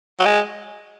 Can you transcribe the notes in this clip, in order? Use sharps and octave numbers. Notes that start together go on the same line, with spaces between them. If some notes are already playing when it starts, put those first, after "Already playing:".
F#3
G#3